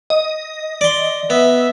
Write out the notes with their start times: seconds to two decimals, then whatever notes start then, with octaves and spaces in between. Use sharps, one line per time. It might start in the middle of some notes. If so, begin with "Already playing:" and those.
0.10 D#5
0.81 D5 C6
1.30 B3 E5